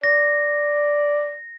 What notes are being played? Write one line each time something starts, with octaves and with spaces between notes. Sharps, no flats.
D5 A#6